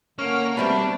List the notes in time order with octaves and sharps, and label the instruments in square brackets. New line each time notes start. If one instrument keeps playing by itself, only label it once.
[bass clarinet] D3 [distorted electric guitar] A#3 [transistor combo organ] C#4 F6
[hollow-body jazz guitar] B2 G3 C4 [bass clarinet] A3 [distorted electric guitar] D4 [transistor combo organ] B4